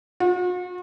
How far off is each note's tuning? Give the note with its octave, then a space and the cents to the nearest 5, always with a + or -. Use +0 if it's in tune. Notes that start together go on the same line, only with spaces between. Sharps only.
F#4 -45